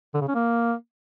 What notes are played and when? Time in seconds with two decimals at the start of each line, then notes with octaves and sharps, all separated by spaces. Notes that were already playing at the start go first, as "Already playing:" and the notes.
0.14 D3
0.21 C#3
0.28 C#4
0.35 A#3